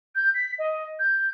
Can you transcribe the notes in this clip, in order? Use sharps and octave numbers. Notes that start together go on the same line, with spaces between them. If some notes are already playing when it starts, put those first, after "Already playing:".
G6
B6
D#5
G6